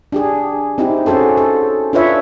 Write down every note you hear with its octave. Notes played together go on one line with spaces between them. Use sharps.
D4 G4 G#4
C4 D#4 E4 G4
C#4 F#4 G#4 A4 C5
A4
D4 F4 B4 C#5 E5